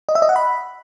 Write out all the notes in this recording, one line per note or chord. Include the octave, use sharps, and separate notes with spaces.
D#5
E5
D#5
F#5
B5